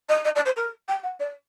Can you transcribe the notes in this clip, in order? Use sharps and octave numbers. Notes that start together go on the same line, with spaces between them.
D#5
D#5
D5
C5
A#4
G5
F#5
D5